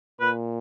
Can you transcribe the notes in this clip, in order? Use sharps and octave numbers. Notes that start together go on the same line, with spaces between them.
A#2 B4